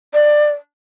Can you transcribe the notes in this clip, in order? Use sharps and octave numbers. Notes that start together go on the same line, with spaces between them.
D5